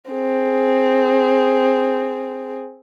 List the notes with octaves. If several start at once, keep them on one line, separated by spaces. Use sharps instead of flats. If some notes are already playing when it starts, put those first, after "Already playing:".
C4 G#4